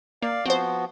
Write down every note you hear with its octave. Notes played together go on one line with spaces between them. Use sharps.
A#3 D5 F5
F3 B3 C4 F#4 C5